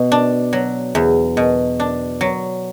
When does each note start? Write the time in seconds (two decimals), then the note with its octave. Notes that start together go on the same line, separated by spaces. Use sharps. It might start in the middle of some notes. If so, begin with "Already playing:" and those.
Already playing: B2
0.12 D4
0.53 F#3
0.95 E2
1.37 B2
1.80 D4
2.21 F#3